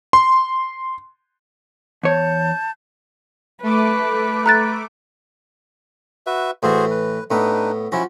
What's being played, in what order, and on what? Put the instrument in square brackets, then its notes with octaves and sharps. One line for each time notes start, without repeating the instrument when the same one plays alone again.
[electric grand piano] C6
[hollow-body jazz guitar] E2 C#5 [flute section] A5 G6
[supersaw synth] A3 D6 [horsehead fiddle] B4
[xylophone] A#5 F#6 A6
[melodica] F#4 B4 E5
[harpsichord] A2 E3 [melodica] F#4 G#4 C5
[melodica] B4
[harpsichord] A2 B3 [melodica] D4 D#4 B4
[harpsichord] F3 F#4 [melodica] C#4 E4